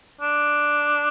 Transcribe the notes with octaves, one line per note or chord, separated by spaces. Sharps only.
D4